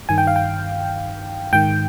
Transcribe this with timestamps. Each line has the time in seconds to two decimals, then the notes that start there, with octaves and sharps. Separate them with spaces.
0.09 G2 D#3 G#5
0.18 G5
0.27 F5
0.36 G5
1.53 G#2 D#3 G5